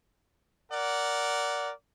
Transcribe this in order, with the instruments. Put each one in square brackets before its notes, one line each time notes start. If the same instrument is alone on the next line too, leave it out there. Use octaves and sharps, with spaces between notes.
[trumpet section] A#4 D5 F#5